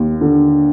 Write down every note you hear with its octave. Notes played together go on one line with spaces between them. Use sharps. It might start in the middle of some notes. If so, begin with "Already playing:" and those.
Already playing: D#2
D3